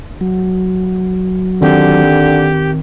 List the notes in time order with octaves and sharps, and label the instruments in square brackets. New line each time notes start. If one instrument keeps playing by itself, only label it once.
[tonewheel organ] F#3
[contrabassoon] D3 [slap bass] D#3 C4 [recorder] G4